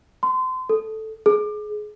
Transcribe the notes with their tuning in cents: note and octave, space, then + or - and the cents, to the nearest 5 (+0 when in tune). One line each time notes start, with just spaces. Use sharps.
C6 -30
A4 -5
G#4 +25